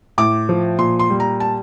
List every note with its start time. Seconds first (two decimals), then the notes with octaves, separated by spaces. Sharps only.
0.18 A2 D6
0.49 F3
0.78 A#2 C6
0.99 C6
1.10 G3
1.20 A#5
1.40 A5